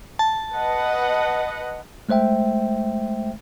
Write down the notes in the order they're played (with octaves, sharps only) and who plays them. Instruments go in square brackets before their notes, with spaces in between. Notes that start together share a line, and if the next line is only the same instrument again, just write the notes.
[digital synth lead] A5
[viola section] B4 D#5 F#5
[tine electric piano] G#3 A3 C5 E5 G5